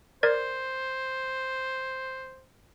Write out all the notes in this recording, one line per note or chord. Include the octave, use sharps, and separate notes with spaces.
A#4 C5 D5 G#6